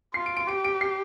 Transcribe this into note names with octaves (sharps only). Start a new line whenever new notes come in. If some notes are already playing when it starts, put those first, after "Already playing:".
F4 C7
D7
D7
G4 D7
D7
C7